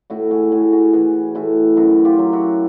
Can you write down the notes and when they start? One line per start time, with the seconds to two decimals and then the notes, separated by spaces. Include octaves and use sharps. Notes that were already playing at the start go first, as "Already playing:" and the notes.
0.10 A2 E4 F#4
0.31 F#4 G#4
0.52 A2 F#4 G#4
0.73 F#4 G#4
0.93 E3 F#4 G#4
1.35 A2 E4 F#4
1.77 F#2 E4 F#4
2.05 F4 G4
2.19 F#3
2.33 E4 F#4